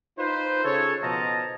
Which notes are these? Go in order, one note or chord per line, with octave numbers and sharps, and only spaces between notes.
D#4 F4 B4 C5
C#3 G#4 A4 C#5
B2 F3 F4 D#5 A5 A#5